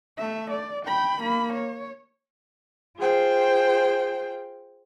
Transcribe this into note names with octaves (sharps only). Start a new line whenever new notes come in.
A3 E5
D5
G5 B5
A#3 B5
C#5
F4 G#4 C5 G5